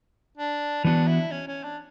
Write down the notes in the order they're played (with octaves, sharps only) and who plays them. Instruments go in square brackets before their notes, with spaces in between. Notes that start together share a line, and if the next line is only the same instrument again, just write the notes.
[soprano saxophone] D4
[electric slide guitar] E3 B3 F#4 [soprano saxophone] D4
[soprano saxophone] E4
C#4
C#4
D4